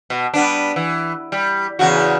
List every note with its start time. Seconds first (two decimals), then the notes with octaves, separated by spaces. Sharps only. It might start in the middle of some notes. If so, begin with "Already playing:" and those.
0.10 B2
0.34 G3 B3 D4
0.76 E3
1.32 G3
1.79 E2 C#3 F#4